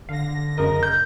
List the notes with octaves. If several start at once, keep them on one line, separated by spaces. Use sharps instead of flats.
D3 F5 A#6
F#2 C#3 A#4 D#5
G6